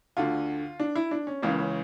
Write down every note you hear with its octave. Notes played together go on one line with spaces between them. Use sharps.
D2 D3 F4
D4
E4
D4
C#4
C#2 C#3 E3 A#3
C#4